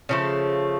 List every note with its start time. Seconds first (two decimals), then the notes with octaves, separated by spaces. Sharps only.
0.09 C#3 F3 A3